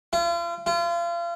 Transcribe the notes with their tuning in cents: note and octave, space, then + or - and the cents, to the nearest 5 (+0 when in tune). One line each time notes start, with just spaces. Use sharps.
F4 -40
F4 -35